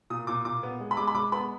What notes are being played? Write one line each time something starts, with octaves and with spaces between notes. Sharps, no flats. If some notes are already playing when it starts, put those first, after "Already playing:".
A#2 D#6
A#2 D6
A#2 D6
B3
G#3
B5
G#3 D6
B5
G#3 D6
B3 B5